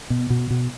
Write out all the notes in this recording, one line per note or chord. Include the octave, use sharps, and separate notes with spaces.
B2
B2
B2